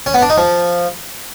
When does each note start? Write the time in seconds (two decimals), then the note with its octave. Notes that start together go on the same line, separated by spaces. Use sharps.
0.06 C#4
0.14 B3
0.22 D4
0.30 D#4
0.38 F3